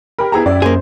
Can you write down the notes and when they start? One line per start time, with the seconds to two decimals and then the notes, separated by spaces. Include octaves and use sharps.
0.19 G4 A#4 B5
0.32 B3 E4 G4 G#4 A#5
0.46 F#2 D5
0.62 A#3 G#4 C5